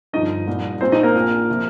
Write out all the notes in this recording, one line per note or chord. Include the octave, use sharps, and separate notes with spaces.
G1 G2 F3 D#4 D#5
C2 A#2 F3
A#1 A#2 F3 C4 C5
D#4 D#5
A#3 A#4
A#1 A#2 F3
C3 F3